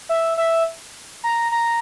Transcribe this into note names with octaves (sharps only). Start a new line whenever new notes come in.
E5
E5
A#5
A#5